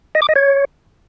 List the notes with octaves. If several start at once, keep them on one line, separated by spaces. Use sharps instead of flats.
D#5
D6
D#5
C#5